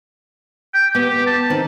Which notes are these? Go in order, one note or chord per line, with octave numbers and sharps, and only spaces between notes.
G5
B3 G4
A5
D#3 C4